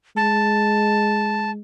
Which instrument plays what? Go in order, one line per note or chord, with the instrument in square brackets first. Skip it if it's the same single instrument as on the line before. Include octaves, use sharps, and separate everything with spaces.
[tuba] G#3 [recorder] A5